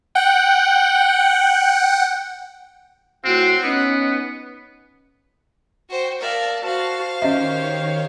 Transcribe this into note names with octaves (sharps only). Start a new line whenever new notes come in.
F#5 G5
A2 C4 F#4 F#5
B3 C#4 D#4
F#4 C5 G5
A#4 D5 E5 F5 A5
F#4 C5 F5
D#3 C#4 G4 C#5 D#5 E5